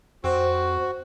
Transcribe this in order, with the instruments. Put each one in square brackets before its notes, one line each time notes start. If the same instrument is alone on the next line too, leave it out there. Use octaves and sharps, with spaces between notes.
[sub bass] F2 [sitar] C4 [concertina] F#4 [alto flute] C5